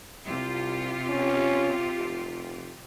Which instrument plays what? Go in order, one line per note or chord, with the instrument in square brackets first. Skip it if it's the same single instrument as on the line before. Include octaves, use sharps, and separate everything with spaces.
[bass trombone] C2 [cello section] C3 F4 G4
[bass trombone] C#4
F1